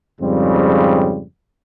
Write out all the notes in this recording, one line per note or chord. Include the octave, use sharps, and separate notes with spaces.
F2 G#2 C#3 G3 C4